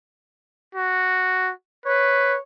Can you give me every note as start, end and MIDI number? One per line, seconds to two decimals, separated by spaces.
0.75 1.52 66
1.86 2.36 71
1.86 2.36 73